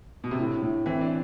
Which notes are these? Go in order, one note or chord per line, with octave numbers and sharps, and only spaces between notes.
B2
C3
A2 D3
A2
E3 C4
D4